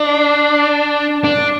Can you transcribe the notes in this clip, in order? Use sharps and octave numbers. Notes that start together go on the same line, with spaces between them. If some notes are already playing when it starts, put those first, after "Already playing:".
Already playing: D4
D4